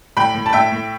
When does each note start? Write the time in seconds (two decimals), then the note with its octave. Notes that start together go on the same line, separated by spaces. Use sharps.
0.17 A2 G5 B5
0.35 A2
0.46 A5
0.53 A2 E5 G5
0.72 A2